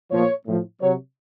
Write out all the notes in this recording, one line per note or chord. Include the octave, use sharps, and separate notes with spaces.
A#2 F3 C#5
A2 F3
C3 F#3 C#5